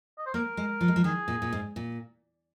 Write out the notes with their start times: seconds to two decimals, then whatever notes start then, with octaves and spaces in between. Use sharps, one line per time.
0.18 D#5
0.26 C5
0.34 A#3 A#4
0.57 G#3
0.81 F3
0.88 G#3
0.96 F3
1.04 D#3 G#4
1.28 A#2
1.42 A#2
1.52 G#2
1.76 A#2